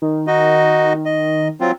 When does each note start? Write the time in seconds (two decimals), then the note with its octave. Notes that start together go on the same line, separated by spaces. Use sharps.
0.02 D#3
0.27 D#4 F#4 D#5
1.05 D#5
1.60 F#3 C4 F4